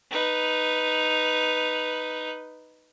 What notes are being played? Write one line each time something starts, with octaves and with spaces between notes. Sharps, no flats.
D#4 B4